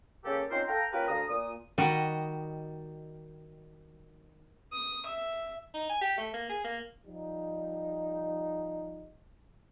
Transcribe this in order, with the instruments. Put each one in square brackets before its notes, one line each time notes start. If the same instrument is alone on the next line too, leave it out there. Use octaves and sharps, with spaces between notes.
[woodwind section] C#3 A#3 G4 A4
C4 C#4 D#4 F4 A#4 C5
A4 F5 G5 A#5
A#3 C#4 F4 G4 A#4 B4
D2 D3 C5 F5 A#5 D#6
A#2 D#6
[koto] D#3 G3 F#4 D#5
[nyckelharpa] D#6
E5
[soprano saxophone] D#4
G#5
G4
A3
A#3
G#4
A#3
[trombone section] F3 G3 D#4